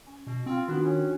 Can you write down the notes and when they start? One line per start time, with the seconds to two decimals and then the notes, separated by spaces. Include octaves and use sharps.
0.07 C#4 G#5
0.27 B2
0.46 C4 F4 G#5 C6
0.68 D#3 B3 D4 D#4 F4 F#4 F#6
0.83 C#4